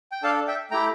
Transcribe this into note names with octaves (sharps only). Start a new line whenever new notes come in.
G5
D4 A4 F5 A5
E5 G5
A3 E4 G4 G5 A#5